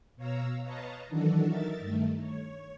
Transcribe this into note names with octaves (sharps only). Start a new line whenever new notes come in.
B2 C#5 F5 A#5 E6
B4 C#5 D#5 F5 A5 A#5
D#3 E3 F#3 D4 F#4 A4
D#4 A#4 E5 A6
G2 D#3 A3
C#5